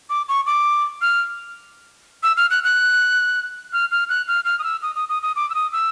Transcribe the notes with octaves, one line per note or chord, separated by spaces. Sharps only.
D6
C#6
D6
F6
E6
F6
F#6
F#6
F6
F6
F#6
F6
F6
D#6
E6
D#6
D#6
D#6
D#6
D6
E6
D#6
E6